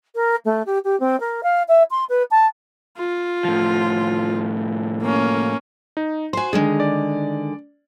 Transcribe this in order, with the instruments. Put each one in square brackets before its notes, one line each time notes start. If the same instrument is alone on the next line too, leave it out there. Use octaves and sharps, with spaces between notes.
[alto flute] A#4
A3
G4
G4
C4
A#4
F5
E5
C6
B4
A5
[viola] F4
[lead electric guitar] A2 F3
[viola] A#3 C#4
[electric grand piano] D#4
[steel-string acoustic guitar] F#4 C5 [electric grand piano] G#5 C6
[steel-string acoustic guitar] D3 D#3 G#3 [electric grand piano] G#4
[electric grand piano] D5